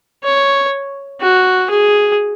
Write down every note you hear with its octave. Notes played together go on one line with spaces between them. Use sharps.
C#5
F#4
G#4